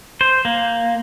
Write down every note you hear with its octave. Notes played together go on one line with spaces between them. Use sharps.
C5
A#3